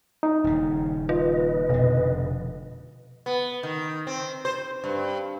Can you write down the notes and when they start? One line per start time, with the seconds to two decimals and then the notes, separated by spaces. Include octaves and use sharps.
0.23 D#4
0.44 D#1 C#3
1.09 F4 B4 D#5
1.69 F1 B2 D3
3.26 B3
3.63 D#3
4.07 C4
4.45 C5
4.84 G2